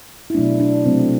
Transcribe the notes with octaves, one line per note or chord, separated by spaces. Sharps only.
E4
B2 F#3 A3 D4
D4
C3 F#3 A3 C4